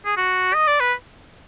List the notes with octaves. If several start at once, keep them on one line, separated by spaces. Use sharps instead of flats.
G#4
F#4
D#5
D5
B4